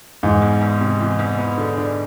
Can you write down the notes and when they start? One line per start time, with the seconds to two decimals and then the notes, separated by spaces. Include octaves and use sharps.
0.23 G#2 E3
0.42 E2
0.61 E2
0.81 C3
1.00 E3
1.19 E2
1.39 B3
1.58 D3
1.77 D4